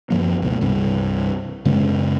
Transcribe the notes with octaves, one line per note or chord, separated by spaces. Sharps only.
F#2 F3 A#3
C#2 B2
C2 G2 C3
F#2 C#3 G#3 C#4